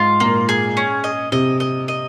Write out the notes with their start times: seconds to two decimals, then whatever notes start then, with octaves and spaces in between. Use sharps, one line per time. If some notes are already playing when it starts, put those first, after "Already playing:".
Already playing: G#2 F4
0.20 A#2 A#3
0.49 G#4
0.77 C#4
1.04 D#5
1.32 C3 D#5
1.60 D#5
1.88 D#5